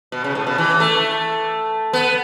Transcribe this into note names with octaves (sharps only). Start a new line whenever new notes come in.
B2
C#3
A2
B2
E3
A3
B3